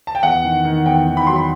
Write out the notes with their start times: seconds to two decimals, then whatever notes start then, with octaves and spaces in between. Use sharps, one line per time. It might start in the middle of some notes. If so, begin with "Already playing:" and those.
0.07 A5
0.15 G5
0.23 E2 F#5
0.44 D#3
0.65 D#3
0.86 E2 G5
1.07 D#3
1.17 B5
1.27 F#3 C6
1.36 B5